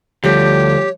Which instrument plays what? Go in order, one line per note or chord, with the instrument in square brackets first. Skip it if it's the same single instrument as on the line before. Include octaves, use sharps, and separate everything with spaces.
[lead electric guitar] D2 [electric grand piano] F3 G3 [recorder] G4 [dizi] C#5